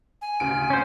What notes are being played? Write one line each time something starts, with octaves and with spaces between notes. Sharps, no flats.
G#5
D2 C#3 D7
C#4 C5